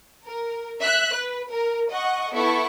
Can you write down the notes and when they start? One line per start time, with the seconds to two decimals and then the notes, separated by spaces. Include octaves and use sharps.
0.26 A#4
0.80 E5 F#6
1.14 B4
1.50 A#4
1.90 D#5 F#5 C#6
2.33 B3 E4 A4 C#6